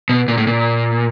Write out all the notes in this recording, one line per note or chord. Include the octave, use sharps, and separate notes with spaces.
B2
A#2
A2
A#2